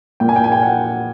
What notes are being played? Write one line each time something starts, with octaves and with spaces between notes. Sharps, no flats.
A#2 G5
G#5
G5
G#5
G5
F#5